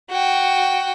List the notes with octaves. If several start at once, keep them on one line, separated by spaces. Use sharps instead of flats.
F#4 G5